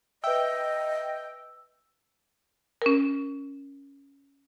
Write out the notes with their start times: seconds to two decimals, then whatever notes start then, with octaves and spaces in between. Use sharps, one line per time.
0.24 B4 D#5 E5 G5 E6
2.82 C#4 A#4